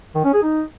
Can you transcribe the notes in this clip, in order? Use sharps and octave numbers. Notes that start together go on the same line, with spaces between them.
D#3
C#4
G#4
D#4